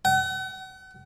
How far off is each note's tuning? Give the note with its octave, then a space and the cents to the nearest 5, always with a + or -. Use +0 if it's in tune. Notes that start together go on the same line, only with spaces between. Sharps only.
F#5 +40